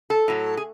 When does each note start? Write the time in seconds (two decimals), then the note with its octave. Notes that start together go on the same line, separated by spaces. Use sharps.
0.10 A4
0.28 A2 F#3
0.57 G#4